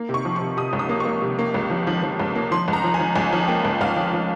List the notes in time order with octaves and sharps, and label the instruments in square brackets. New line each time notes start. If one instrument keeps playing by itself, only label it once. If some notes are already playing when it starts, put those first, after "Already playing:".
Already playing: [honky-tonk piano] A#3
C3
C#6
F3
C#6
C3
C3 D#6
C#2
D#6
A#3
C#6
A#3
C3
A#3
C#2
F3
F3
F3
C#2
A#3
F3 C6
C#2
A#5
F3
G#5
F3
C#2 G#5
F3
A#3 G5
C#2
C#2 F5
F3
F3